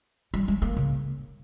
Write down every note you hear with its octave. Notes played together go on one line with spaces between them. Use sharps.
G3
G#3
A#3
C#3